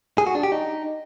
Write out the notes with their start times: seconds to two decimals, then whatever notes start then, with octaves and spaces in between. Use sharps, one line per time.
0.18 G#4
0.27 F#4
0.35 D4
0.43 G4
0.52 D#4